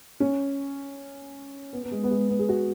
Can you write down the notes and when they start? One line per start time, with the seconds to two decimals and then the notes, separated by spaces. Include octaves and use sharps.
0.20 C#4
1.73 B3
1.83 B3
1.91 G#3
2.04 B3
2.11 G#3
2.29 B3
2.39 G#4
2.49 F#4